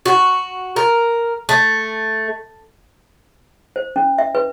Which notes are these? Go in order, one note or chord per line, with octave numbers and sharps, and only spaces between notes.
F#4
A#4
A3
C5
C#4
E5
B4